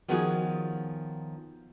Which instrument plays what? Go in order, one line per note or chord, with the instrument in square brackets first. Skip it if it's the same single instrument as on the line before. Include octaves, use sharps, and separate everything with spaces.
[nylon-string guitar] D#3 F3 B3 C#4 F#4 G#4